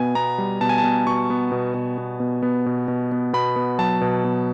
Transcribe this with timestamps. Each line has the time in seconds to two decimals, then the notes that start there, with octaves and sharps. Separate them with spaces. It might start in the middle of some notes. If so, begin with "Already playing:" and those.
Already playing: B2 B3 G#5
0.15 B3 A#5
0.38 G3
0.61 B2 A5
0.69 G#5
0.78 A5
0.83 B2
1.07 B2 C#6
1.30 B3
1.52 B2
1.74 B2
1.98 B3
2.20 B2
2.42 B3
2.66 B2
2.88 B2
3.12 B3
3.33 B2 B5
3.56 B3
3.79 F#3 A5
4.01 B2
4.24 B2